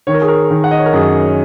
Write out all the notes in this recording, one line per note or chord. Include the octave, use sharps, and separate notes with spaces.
D#3 C#5
A#4
G#4
A#4
D#3
F#5
D#5
C#5
A#4
F#2 G#4